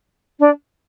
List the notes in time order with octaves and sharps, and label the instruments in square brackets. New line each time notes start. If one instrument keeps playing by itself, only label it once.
[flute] D4